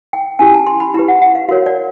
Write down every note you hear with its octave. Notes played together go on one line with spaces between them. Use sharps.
G5
C#4 E4 G4 G#5
A5
C6
B5
E4 G4 B4 A#5
F#5
F#5
F5
F#4 A#4 C#5 F5
D5